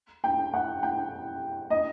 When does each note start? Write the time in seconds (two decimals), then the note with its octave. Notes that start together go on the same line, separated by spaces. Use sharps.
0.24 G5
0.54 F#5
0.83 G5
1.70 D#5